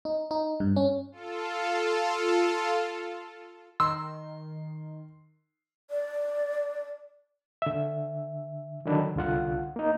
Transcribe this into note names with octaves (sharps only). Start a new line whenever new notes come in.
D#4
D#4
G2
C#4
F4 A4
D#3 C6 E6
D5
D3 E5
D3 D#3 F#3 D4 B5
C2 D3 F4 F#5
A#3 D#4